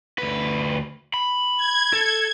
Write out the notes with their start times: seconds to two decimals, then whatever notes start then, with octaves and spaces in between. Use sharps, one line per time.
0.18 D2 B4
1.14 B5
1.57 G#6
1.93 A4